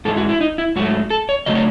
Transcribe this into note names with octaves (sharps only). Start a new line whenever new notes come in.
G#2 E3 G#3 A4
F#4
E4
D#4
E4
G#2 F#3 A3 F#4
A4
C#5
C#3 F#3 A3 D#5
C#5